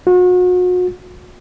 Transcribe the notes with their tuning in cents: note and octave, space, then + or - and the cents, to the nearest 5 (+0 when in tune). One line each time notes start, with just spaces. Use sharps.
F#4 -35